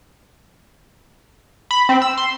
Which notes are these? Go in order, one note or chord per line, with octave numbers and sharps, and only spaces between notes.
B5
C4
E6
C6